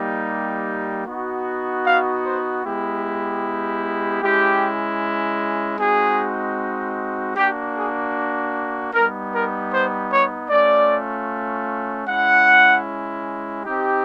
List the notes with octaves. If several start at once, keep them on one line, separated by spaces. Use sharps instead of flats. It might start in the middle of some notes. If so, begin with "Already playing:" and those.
Already playing: G3 A#3 D#4 G4
B3 D#4 F#4
F5
C5
G#3 B3 E4 G4
G#3 C#4 E4 G4
G#3 C4 D#4 F#4 G#4
A#3 D4 F#4 G4
G#4
G3 B3 D#4 A#4
A#4
C5
C#5
A3 C#4 F4 D5
G#3 C#4 E4 F#5
C4 D#4 G4